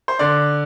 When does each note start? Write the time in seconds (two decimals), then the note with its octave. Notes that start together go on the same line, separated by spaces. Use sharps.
0.08 C5
0.19 D3 D5